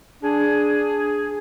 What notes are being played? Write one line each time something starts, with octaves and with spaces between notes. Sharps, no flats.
D4 G#4